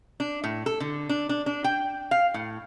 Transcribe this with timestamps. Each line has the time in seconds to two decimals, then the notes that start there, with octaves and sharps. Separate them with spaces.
0.20 D4
0.44 A2
0.66 A4
0.80 D3
1.09 D4
1.29 D4
1.46 D4
1.64 G5
2.11 F5
2.34 A2